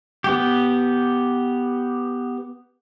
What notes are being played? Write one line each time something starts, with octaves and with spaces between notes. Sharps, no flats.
B3 G4